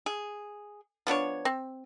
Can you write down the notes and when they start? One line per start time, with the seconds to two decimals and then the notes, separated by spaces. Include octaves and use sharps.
0.06 G#4
1.07 F3 B3 D4 C#5
1.45 C4